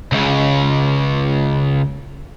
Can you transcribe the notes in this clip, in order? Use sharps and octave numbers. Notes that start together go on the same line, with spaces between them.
C#2 C#3